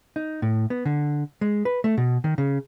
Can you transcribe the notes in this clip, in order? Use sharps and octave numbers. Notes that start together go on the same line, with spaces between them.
D#4
A2
B3
D3
G#3
B4
A3
B2
D#3
C#3